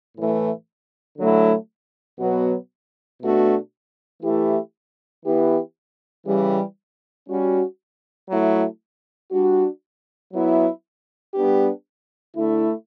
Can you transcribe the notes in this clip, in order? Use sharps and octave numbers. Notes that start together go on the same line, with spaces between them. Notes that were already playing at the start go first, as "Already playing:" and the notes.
A2 E3 A3
D3 F#3 A3 E4
B2 F#3 B3 F#4
B2 A3 D4 F#4
E3 A3 E4 G4
E3 B3 E4 G4
C#3 E3 G3
G3 C#4 F#4
F#3 A3 E4
G3 D4 F#4
F#3 B3 E4
G3 B3 D4 G4
D3 A3 E4